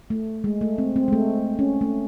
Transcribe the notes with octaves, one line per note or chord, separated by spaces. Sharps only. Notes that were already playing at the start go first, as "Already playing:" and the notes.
A3
G#3
A3
C4
C4
G#3
A3
C#4
A3